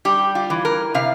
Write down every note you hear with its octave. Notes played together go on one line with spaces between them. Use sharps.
G3 G4
F4
E3
A#4
C3 F5